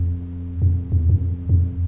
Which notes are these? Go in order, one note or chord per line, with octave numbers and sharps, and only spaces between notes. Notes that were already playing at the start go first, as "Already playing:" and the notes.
Already playing: F2
F2
E2
F#2
F2
F2